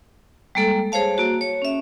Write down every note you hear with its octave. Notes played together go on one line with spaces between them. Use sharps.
G3 G#3 A#3 A4
G#4 C5 C#5 F5 A5
A#3 F#4
C#5
C#4 E5